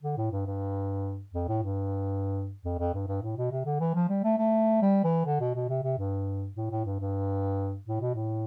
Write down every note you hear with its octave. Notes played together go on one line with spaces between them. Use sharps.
D3
A2
G2
G2
F2
A2
G2
F2
F2
G2
G2
A2
B2
C3
D3
E3
F3
G3
A3
A3
G3
E3
D3
B2
B2
C3
C3
G2
A2
A2
G2
G2
A2
B2
A2